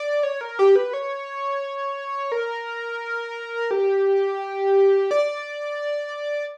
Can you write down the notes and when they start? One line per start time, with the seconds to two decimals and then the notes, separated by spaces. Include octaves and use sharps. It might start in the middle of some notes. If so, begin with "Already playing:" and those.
Already playing: D5
0.23 C#5
0.41 A#4
0.59 G4
0.76 B4
0.93 C#5
2.32 A#4
3.71 G4
5.11 D5